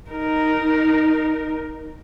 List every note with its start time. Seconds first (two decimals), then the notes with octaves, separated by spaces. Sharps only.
0.10 D#4 A#4